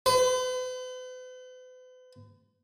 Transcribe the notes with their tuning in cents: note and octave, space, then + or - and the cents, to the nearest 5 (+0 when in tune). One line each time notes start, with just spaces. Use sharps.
B4 +45